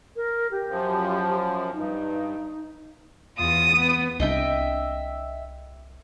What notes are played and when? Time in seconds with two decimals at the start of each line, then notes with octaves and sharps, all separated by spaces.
0.16 A#4
0.51 G4
0.69 F#2 F3
1.74 G2 D#4
3.38 E2 F4 D#6
3.75 B3
4.20 C2 D4 D#5 E5 G5